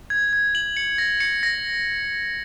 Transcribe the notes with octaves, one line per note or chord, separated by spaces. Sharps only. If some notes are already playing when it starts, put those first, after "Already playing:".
G#6
G#6
F#7
C#7
A#6
C#7
A#6